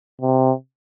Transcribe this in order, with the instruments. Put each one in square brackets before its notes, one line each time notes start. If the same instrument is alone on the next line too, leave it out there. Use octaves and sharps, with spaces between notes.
[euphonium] C3